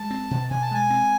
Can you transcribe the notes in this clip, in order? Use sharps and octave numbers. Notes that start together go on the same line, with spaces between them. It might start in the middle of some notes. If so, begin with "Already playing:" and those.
Already playing: G#3 A5
C4
B2
B2 G#5
A5
G#3 G#5
C4